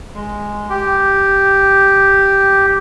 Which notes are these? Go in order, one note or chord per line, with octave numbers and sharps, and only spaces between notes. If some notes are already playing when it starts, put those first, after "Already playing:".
G#3
G4